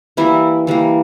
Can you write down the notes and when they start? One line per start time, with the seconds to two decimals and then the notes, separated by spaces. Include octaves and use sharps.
0.17 E3 G3 A#3 E4
0.67 E3 G3 A#3